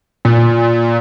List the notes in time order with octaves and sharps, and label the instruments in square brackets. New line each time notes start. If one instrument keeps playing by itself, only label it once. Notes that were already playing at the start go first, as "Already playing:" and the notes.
[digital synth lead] A#2